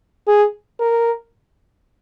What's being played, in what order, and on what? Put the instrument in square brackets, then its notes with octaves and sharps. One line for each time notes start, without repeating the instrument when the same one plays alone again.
[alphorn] G#4
A#4